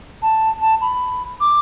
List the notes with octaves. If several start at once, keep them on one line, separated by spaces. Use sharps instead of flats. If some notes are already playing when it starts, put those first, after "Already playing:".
A5
A5
B5
D6